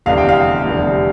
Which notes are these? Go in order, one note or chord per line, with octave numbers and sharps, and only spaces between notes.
F1 E2 D3 G3 F5
G5
F5
F1 E2 D3 G3